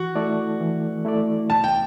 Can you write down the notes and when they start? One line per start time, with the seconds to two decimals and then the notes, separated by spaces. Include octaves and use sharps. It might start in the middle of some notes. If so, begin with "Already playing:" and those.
Already playing: E3 F#4
0.15 A3 E4 A4 D5
0.60 E3
1.05 A3 E4 A4 D5
1.50 C2 A5
1.64 G5